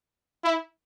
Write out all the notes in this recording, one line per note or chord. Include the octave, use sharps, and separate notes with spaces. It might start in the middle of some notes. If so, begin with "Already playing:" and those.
E4